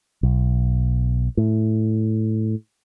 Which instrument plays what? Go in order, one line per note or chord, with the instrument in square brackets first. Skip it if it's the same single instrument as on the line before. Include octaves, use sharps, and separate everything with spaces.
[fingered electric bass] B1
A2